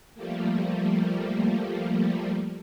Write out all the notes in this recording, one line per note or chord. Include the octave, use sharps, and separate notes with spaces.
F3 G3 A3 A#3